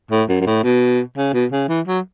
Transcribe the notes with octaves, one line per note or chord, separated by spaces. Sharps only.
A2
F#2
F#2
A2
B2
C#3
B2
C#3
E3
F#3